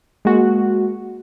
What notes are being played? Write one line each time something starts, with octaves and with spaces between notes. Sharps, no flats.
G#3 A#3 F#4